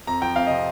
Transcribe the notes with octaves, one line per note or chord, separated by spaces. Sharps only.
F2 A#5
F3 G5
F2 F5
C3 D#5